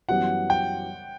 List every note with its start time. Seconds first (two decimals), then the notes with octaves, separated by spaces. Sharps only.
0.08 F#2 E3 G3 B3 F#4 F#5
0.50 G5